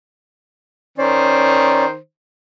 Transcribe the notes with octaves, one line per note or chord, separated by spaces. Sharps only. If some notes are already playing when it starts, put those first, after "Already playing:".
D#3 C#4 C5 D5